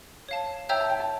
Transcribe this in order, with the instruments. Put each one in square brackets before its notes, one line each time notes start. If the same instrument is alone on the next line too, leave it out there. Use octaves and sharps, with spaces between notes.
[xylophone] C#5 F5 A5
[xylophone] C#5 E5 A#5 E6 G6 [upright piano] G5
[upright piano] A5
G5
A5